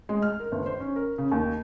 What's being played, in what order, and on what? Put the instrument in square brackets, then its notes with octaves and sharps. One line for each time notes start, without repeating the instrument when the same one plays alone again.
[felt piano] G#3
F6
A#4
G1
C5
C#4
A#4
C#3
D#2